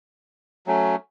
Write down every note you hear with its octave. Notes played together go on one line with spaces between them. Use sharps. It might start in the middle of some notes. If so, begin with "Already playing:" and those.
F#3 A3 C#4